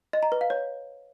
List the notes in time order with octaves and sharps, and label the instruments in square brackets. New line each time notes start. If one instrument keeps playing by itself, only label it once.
[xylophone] D#5
A#5
B4
F5
C#5